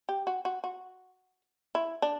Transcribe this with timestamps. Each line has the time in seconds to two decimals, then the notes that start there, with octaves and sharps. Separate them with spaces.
0.09 G4
0.27 F#4
0.45 F#4
0.64 F#4
1.75 E4
2.02 D4